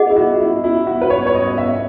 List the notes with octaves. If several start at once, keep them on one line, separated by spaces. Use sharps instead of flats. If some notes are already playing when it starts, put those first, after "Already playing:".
Already playing: F#4 G#4 D#5 F#5
E4
F#4
E4
E4
F#4
B4
C#5
C#5
D#5
E5